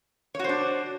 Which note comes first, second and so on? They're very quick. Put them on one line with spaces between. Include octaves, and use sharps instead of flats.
C#5 F#4 C5 D4